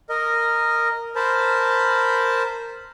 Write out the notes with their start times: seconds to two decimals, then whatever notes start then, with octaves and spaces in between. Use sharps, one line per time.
0.09 A#4 D#5
1.16 A#4 C5 A5 B5